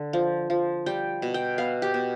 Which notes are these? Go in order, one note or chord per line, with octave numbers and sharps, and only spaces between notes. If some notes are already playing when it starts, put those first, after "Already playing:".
Already playing: D3
F3
F3
G3 G5
B2
G5
B3 F5
G4
B2